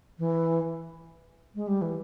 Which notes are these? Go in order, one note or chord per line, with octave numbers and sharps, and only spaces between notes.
E3
G#3
G3
E3